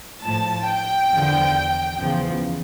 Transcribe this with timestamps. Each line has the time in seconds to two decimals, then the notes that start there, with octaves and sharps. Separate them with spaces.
0.23 A2 F3 A5
0.67 G5
1.11 E2 D3 F3
2.00 E2 C#3 F3